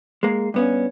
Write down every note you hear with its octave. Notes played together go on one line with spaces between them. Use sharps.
G#3 A#3
G2 B3 C#4